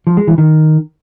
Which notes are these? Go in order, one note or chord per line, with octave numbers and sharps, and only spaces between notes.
F3
G#3
E3
D#3